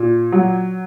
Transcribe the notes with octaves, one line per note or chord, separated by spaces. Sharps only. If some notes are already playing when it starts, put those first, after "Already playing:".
Already playing: A#2
F#3